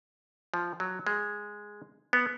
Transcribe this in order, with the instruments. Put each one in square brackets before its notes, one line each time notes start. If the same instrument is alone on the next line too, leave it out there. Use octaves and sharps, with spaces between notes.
[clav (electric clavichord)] F3
F#3
G#3
B3